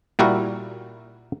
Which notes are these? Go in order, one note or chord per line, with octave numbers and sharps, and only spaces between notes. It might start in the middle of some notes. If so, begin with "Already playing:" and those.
A#2 G3 E4 F#4 A#4